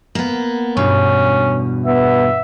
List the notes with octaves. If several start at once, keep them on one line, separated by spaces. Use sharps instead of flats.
A#3 B3
E2 G2 B2 C#4
B3 E5